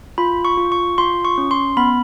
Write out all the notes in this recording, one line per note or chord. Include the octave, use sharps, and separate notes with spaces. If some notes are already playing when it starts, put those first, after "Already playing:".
F4 B5
C#6
F4
C#6
F4 C6
C#6
C#4
C6
B3 B5